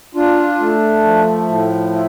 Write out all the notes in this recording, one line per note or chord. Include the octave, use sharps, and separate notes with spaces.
D4 F4
A3
F3
A2
E4 F4